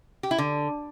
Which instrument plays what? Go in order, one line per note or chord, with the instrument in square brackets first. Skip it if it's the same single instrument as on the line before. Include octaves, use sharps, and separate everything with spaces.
[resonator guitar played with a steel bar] G4
E4
D3